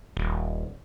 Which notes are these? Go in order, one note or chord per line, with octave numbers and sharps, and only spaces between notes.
D#1